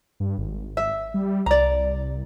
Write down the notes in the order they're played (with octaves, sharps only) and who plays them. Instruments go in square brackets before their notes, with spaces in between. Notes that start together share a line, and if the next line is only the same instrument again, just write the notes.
[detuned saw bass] G2
G#1
[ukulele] E5
[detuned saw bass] G3
[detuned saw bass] C2 [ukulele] D5 A#5